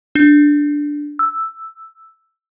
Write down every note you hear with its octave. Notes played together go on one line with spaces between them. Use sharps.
D4
E6